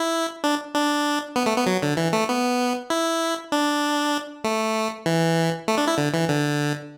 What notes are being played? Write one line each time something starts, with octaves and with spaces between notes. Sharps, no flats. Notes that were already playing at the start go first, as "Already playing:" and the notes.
Already playing: E4
D4
D4
B3
A3
B3
F#3
D3
E3
A3
B3
E4
D4
A3
E3
A3
D4
E4
D3
E3
D3